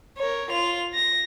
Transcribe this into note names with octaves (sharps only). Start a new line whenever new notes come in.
A#4 C#5
F4 F7
A#6